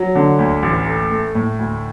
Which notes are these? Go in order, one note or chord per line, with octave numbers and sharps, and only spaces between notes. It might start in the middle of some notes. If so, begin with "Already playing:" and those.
Already playing: F#3
D3
D2
A1
A3
A3
A2
D2